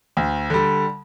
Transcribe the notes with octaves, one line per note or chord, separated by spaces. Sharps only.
D2
D3 G3